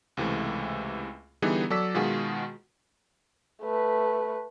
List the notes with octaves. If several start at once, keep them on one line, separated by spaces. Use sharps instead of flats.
C#2 C3 E3 A3
D3 E3 G3 B3 D#4 G#4
F#3 A4 D5 E6 B6
B2 D#3 G#3 F4 F#4 G#4
A3 B4